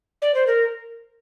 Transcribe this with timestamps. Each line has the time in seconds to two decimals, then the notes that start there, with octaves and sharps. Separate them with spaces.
0.22 D5
0.34 C5
0.47 A#4